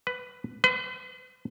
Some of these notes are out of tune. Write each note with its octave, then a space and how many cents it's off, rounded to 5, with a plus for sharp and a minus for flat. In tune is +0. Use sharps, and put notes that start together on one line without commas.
B4 +15
B4 +45